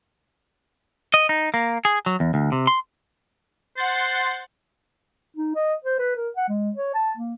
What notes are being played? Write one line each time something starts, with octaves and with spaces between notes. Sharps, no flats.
D#5
D#4
A#3
G#4
F#3
E2
D2
C3
C6
C5 F#5 C6 A6
D#4
D#5
C5
B4
A#4
F#5
G#3
C#5
A5
A#3